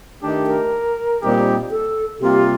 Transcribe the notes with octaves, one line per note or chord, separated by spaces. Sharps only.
D#3 A3 D4 G4
A#4
A#2 G3 C4 D#4 G4
A4
C3 G3 A#3 F4 G4